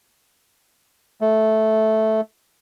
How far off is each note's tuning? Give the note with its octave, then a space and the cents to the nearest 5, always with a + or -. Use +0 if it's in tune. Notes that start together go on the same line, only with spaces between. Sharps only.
A3 -10